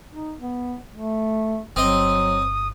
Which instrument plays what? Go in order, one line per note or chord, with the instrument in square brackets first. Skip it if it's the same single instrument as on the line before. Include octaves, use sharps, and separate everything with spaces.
[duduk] D#4
B3
A3
[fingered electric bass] G1 [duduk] F#3 [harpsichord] C4 D#5 [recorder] D#6